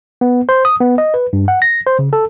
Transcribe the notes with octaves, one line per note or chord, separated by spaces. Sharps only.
B3
C5
D#6
B3
D#5
B4
G2
F#5
A#6
C5
C#3
A4